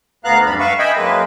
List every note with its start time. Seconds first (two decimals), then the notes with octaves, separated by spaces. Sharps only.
0.25 D2 B3 F5 A#5 F#6
0.46 F#2 G3 D4 B5
0.59 B4 E5 F5 C#6
0.79 D#5 E5 G5 G#5 B5
0.96 F#2 G#3 A#3 B4